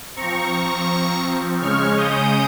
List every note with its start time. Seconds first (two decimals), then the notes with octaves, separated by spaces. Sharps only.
0.16 F3 C4 A#5 C#6
1.61 C#3 G#3 C#4 C#6 F6
1.97 D#6 G6